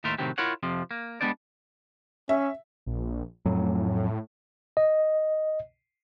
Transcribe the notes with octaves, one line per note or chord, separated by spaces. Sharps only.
D#2 A2 A3 A#4 E5 C6
A2 C3 D#3 F#3 C4 G4
E4 F4 A#4 C#5 F#5
F2 C3 F3
A#3
G3 G#3 B3 D4 C5 D5
C#4 E5
A#1
F2 A2 F#3
D#5